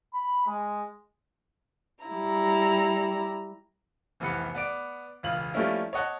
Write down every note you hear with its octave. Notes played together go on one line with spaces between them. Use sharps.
B5
G#3
G3 E4 A#5
F1 C2 E3 B3 B5 C#7
B3 D5 D7
E1 C#2 F4 F#7
F3 G3 A3 A#3 C#4 E4
C#5 D#5 F#5 A5